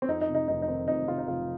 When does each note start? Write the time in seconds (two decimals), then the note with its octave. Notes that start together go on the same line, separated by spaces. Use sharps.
0.02 C4
0.08 F2 D#4
0.21 D#4
0.29 C3
0.35 D#4
0.48 F1 D#4
0.62 D#4
0.68 D#3 C4
0.88 F2 D#4
1.08 C3 F4
1.18 D#4
1.27 F1 F4